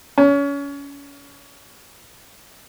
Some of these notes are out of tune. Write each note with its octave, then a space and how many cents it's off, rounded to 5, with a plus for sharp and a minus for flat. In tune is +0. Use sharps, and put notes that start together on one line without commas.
C#4 +30